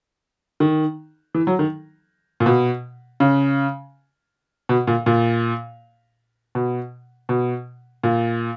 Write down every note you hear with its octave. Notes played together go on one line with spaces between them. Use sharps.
D#3
E3
F#3
D#3
A#2
B2
C#3
B2
A#2
A#2
B2
B2
A#2